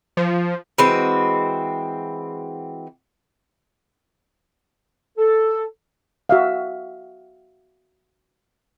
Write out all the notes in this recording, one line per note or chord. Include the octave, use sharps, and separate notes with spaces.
F3
E3 G#3 C4 F#4
A4
F#4 E5 F5